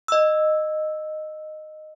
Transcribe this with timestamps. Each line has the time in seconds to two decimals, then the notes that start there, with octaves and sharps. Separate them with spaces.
0.08 D#5 E6